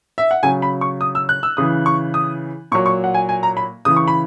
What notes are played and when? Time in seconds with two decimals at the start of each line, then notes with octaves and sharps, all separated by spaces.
0.18 E5
0.31 F#5
0.43 C#3 F#3 G#5
0.62 B5
0.81 C#6
1.01 D#6
1.15 E6
1.29 F#6
1.43 E6
1.57 C#3 E3 D#6
1.86 C#6
2.14 D#6
2.72 A#2 C#6
2.75 F#3
2.86 C#6
3.04 F#5
3.14 G#5
3.29 G#5
3.43 A#5
3.57 B5
3.85 C#3 E3 D#6
3.96 C#6
4.08 B5